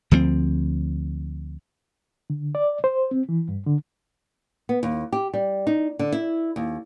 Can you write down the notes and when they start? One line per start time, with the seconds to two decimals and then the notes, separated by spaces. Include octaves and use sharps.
0.11 D2 F3 F#3 C4
2.30 D3
2.55 D5
2.84 C5
3.11 C4
3.29 E3
3.49 G2
3.66 D3
4.69 B3
4.83 D#2
5.12 G4
5.34 G3
5.67 D#4
5.99 D3
6.12 E4
6.56 D#2